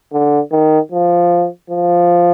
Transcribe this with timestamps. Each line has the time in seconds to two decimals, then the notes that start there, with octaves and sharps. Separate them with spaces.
0.12 D3
0.52 D#3
0.92 F3
1.70 F3